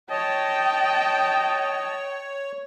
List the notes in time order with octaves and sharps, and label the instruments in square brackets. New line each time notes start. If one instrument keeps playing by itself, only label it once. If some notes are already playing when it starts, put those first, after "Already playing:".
[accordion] C#5 [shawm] D#5 [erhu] G5 [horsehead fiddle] A5